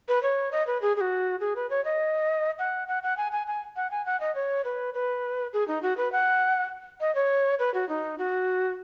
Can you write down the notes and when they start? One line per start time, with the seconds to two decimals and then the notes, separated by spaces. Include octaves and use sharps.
0.08 B4
0.23 C#5
0.52 D#5
0.67 B4
0.82 G#4
0.96 G#4
1.01 F#4
1.40 G#4
1.56 B4
1.70 C#5
1.85 D#5
2.59 F#5
2.88 F#5
3.03 F#5
3.17 G#5
3.32 G#5
3.47 G#5
3.76 F#5
3.91 G#5
4.06 F#5
4.20 D#5
4.35 C#5
4.65 B4
4.94 B4
5.53 G#4
5.68 D#4
5.83 F#4
5.97 B4
6.12 F#5
7.00 D#5
7.15 C#5
7.59 B4
7.74 F#4
7.89 D#4
8.18 F#4